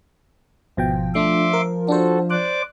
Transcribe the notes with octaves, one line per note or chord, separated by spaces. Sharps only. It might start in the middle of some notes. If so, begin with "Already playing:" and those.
G#1 B2 F3 G5
A3 D4 E5 C6 D6
A#4
D4 F#4 A4 C5
C5 D5 D6 F#6